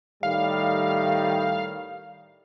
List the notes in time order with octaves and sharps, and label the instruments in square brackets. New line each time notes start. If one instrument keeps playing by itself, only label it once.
[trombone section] A2 D#3 G3 [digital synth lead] F5